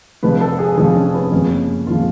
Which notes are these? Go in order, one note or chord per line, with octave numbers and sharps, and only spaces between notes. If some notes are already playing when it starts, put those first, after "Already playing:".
F1 F2 F3 G#3 B4
A4
G#4
F1 F2 F3 G#3 G#4
C#4
B3
F#1 F2 F3 G#3 C#4
F#1 F3 G#3 F4